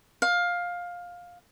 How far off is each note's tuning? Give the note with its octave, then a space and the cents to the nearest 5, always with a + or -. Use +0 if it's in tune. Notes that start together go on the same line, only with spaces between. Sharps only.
F5 +15